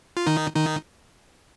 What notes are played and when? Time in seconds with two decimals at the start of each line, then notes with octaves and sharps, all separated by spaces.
0.17 F4
0.26 D#3 D#4
0.56 D#3 D#4